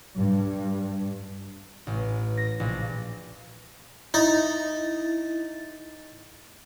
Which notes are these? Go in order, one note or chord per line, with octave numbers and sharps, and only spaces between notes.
G2
A1
A#6
A#1
D#4 E4 A6